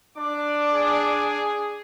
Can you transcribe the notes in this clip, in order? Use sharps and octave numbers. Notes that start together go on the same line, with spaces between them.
D4 D5 D6
G#4